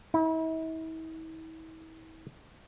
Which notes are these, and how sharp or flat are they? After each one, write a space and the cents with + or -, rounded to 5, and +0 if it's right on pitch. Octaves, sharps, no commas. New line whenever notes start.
E4 -45